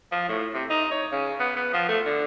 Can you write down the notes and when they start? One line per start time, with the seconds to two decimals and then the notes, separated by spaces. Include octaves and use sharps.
0.12 F3
0.29 A2
0.54 C3
0.70 D#4
0.91 C#5
1.12 C#3
1.39 B3
1.56 B3
1.73 F3
1.88 A3
2.05 D3